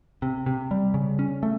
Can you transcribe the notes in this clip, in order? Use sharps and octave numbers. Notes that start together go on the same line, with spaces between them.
C3
C3
G3
C#3
C#4
A3